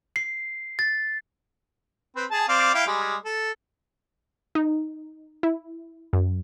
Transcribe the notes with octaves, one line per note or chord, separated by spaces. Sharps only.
C7
A6
C4 B4
G#4 A5
C4 D5 F5
E4 F5 G5
G3 G#3
A4
D#4
E4
F#2